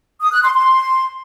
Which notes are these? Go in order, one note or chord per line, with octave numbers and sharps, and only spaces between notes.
D#6
F#6
C6
C6